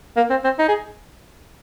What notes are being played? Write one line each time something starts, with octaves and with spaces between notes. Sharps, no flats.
A#3
C4
C4
D#4
G#4